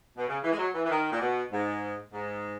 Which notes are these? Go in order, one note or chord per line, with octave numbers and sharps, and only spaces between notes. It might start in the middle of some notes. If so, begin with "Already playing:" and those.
B2
C#3
E3
G#3
F#3
E3
E3
D#3
A#2
B2
G#2
G#2